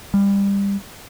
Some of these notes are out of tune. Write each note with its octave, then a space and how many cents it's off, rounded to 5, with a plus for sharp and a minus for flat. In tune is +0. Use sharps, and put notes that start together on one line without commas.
G3 +25